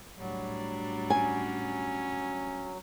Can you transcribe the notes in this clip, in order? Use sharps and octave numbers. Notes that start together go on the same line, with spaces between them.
A2 F#3 G3 D4
C#4 G#5